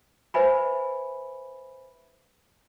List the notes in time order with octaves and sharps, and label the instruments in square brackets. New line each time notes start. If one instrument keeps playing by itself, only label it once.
[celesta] B4 C5 E5 G#5 B5